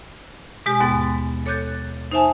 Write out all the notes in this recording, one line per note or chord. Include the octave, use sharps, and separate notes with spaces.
B2 G#3 G4 G#5
D#2 G#2 B2 B3 A6
A4 C#5 D6 F#6 G6 A6
D#4 C5 E5 G#5 A5